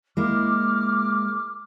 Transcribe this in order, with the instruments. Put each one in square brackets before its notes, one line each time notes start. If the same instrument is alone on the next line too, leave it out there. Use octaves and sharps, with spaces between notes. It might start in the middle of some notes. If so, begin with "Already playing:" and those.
[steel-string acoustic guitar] G#3 A#3 E4 [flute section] D6 F6